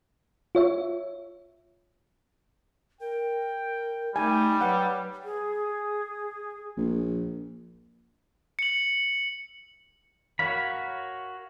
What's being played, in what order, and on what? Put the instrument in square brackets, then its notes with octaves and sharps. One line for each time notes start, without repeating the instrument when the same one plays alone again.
[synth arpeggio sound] F4 C#5 E5
[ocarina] A#4 [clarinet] G5
[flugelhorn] G3 [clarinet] A3 [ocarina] D#4 [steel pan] G#5
[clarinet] F#3 [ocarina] B4 [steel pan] F#5
[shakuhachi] G#4
[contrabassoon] A#1
[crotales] C#7 F#7
[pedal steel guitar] F#4 A#4 C#5 F5 B5